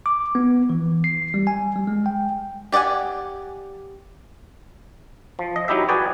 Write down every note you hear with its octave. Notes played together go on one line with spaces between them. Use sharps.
D6
B3
E3
C7
G3
G#5
G3
G#3
G5
G4 D5 D#5 F#5 G#5
F3
D#5
F#3 D#4 E4 G4 E5
F#4 G#4 B4 D5 G5 G#5